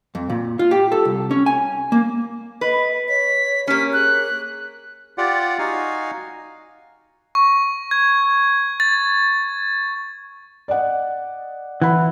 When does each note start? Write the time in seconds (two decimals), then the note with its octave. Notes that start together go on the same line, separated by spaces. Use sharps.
0.15 F2
0.30 A#2
0.59 F4
0.71 G4
0.92 A4
1.05 C2
1.31 C#4
1.46 G#5
1.92 A#3
2.61 B4 D#5
3.08 C#5 B6
3.67 A#3 C#4 G4 B6
3.93 G#4 F#6
5.18 F4 G4 D5 F#5
5.59 D#4 F#4 F5 G#5
7.35 C#6
7.91 G#6
8.80 A6
10.68 D5 D#5 F#5
11.82 E3 F#5 B5